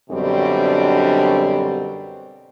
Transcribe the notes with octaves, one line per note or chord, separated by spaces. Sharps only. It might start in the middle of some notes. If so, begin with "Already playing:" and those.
F#2 B2 D3 G3 C4 D4